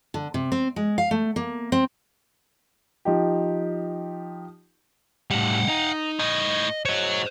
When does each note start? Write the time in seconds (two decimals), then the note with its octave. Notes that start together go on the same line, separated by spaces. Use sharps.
0.14 D3
0.34 C3
0.52 C4
0.76 G#3
0.98 F5
1.11 A3
1.36 A#3
1.72 C4
3.05 F3 D#4 G4
5.31 A2 G3 F5 F#5
5.68 D#4
6.19 A2 D#4 D#5
6.85 F#4 C5 C#5 D#5